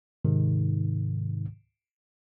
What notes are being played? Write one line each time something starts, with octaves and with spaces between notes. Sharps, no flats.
G#2 C3 D#3